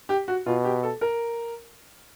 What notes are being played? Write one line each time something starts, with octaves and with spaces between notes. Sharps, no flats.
G4
F#4
B2 F4
G4
A4
A#4